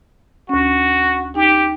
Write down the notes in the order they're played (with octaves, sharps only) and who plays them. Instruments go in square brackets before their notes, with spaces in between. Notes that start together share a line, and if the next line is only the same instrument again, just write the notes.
[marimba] D2 C#4 [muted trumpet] F#4
[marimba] D#4 [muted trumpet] G4